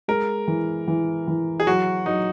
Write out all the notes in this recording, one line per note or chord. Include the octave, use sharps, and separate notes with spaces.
G#3 A#4
E3
E3
E3
G#4
F#3 F#4
F#3 D#4